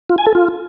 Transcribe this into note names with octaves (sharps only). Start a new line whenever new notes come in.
F4
G#5
A4
F4